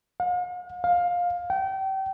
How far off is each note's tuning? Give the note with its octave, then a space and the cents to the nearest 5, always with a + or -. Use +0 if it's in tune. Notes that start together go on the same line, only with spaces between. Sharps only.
F5 +45
F5 +15
G5 -30